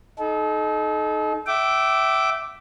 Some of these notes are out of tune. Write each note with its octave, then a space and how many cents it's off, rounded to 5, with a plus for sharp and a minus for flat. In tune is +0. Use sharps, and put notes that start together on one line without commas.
D#4 +0 A4 -40
E5 +0 G5 -35 D6 +0